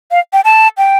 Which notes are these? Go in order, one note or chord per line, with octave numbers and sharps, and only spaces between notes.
F5
G5
A5
G5